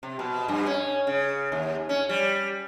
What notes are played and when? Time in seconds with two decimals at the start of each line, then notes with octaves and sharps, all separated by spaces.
0.03 C3
0.19 B2
0.48 G2
0.67 C#4
1.07 C#3
1.52 D#2
1.89 C#4
2.09 G3